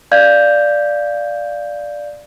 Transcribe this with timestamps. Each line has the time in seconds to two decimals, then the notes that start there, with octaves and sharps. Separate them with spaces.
0.11 D5 F5 G6 G#6